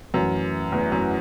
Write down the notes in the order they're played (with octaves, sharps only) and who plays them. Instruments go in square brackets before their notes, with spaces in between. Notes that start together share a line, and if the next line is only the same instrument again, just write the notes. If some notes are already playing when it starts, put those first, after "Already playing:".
[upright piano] F#2 [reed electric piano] E3 A3 E4 B4
[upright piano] E2 [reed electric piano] E3 A3 E4 B4
[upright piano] F#2